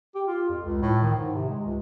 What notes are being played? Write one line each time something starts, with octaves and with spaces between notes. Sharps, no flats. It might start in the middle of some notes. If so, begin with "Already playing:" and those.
G4
F4
F2
C#2
A2
D#3
G#2
C3
G#3
C#2